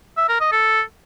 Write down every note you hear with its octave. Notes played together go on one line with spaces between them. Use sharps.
E5
A#4
D#5
A4